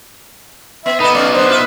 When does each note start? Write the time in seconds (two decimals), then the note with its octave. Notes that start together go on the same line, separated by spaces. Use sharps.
0.86 B3 E5
1.00 B3 D#4 A4 B4 D#5
1.15 A3 C#4 D5
1.34 D3 D4 C5
1.49 F4 B4 E5